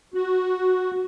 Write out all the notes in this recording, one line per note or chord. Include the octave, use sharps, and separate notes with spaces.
F#4